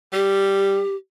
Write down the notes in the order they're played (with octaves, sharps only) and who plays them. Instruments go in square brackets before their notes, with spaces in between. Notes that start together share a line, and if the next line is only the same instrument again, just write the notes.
[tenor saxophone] G3 [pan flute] G4